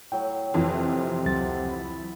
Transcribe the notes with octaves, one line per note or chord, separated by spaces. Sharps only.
A2 F#3 G5
F2 C3 E3 F4
C#2 F#3 F#5 A6
E4 B5